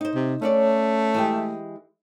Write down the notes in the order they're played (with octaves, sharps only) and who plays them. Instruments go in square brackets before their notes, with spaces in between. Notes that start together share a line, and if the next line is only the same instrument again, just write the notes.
[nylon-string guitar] D#4 C5
[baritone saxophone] C3
[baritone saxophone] A3 [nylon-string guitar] C#4 C#5 D5
[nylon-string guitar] E3 G#3 G4